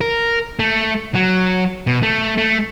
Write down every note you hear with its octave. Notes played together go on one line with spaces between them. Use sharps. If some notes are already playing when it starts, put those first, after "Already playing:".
A#4
A3
F#3
B2
A3
A3